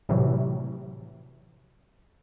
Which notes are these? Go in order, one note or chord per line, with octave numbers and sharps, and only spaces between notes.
A2 C3 E3 F#3